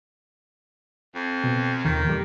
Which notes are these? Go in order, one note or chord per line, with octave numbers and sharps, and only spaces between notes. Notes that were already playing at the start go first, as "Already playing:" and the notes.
F2
B2
D#2 D#3
F2 G3